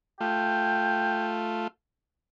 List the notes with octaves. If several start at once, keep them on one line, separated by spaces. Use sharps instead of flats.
A3 F4 G5